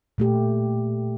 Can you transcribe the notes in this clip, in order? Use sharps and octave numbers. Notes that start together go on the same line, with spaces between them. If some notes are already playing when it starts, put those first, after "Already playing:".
A#2 A3 G4